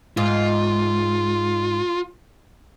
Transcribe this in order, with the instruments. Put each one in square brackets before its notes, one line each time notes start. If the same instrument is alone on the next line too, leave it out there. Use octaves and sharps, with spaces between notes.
[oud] G#2 [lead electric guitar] F4